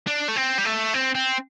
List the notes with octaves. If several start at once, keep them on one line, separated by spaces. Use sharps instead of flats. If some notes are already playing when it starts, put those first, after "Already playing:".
D4
A3
C4
G3
A3
C4
C4